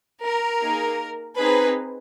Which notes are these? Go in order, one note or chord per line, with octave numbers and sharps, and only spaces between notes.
A#4
A#3 D#4 G#4
C4 D#4 G#4 B4